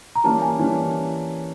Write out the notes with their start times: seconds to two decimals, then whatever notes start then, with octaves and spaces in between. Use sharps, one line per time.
0.15 A#5
0.24 E3 G3 A#3 C#4 A5
0.42 G#5
0.59 E3 G3 A#3 C#4